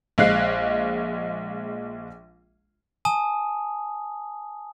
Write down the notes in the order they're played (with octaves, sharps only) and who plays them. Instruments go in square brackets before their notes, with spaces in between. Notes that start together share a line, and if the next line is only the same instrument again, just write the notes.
[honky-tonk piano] A#1 G#3 F5 F#6 C7
[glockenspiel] G#5 A5 D#6